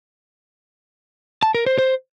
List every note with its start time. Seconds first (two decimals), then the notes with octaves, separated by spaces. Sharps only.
1.43 A5
1.55 A#4
1.66 C5
1.78 C5